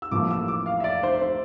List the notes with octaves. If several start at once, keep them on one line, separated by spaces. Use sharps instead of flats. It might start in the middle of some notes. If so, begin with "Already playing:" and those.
E6
A1 A2 F3 A#3 D6
E6
D6
F5
E5
D5
C5
C5